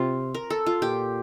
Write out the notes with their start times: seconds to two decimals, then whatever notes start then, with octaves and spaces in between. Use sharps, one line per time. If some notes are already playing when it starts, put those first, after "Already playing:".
Already playing: C3 C4 F4
0.34 A#4
0.50 A4
0.66 F4
0.82 A#2 G4